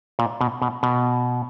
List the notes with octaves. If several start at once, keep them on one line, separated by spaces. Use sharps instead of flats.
A#2
B2
B2
B2